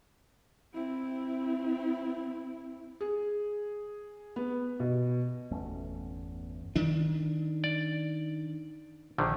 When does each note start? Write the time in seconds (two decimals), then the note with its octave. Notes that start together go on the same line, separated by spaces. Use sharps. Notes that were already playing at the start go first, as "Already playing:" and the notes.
0.74 C4 E4
3.01 G#4
4.36 B3
4.80 B2
5.51 G1 E2 A3 C#4
6.76 D#3 D4
7.64 D5
9.18 A#1 D3 D#3